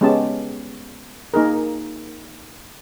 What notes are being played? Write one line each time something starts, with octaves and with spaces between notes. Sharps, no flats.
G#3 B3 C#4 G4 A5
A#3 D#4 G#4 A#4